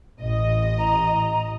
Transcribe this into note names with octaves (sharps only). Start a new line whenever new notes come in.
A1 D#5
A#5